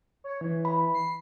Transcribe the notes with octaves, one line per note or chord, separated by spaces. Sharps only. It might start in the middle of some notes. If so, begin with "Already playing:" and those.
C#5
E3
B5
C7